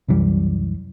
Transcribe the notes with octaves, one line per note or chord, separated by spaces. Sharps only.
C2 F#2 E3 G3